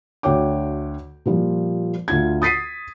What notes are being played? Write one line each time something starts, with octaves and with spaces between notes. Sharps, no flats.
D2 F#4 C#5 G5 D6
A#2 F3 G3
D2 F4 G#6
D#6 A6 B6 C7 D#7